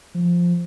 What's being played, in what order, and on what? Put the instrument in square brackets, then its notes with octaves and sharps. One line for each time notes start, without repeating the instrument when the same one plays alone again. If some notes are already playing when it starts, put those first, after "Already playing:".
[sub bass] F3